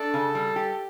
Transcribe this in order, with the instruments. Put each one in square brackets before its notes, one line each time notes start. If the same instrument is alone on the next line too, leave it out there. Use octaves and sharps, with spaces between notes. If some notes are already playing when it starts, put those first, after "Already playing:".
Already playing: [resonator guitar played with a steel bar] D4 [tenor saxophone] A4
[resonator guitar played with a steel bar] C#3
G3
G4